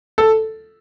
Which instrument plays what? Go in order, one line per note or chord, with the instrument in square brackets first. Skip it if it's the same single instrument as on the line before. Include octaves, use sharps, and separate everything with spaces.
[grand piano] A4